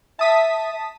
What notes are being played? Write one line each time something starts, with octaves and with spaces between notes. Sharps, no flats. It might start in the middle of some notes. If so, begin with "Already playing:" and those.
E5 A5 D#6 B6